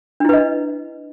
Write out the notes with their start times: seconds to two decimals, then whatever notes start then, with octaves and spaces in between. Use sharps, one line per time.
0.20 D4
0.25 E4
0.29 B4
0.33 D#5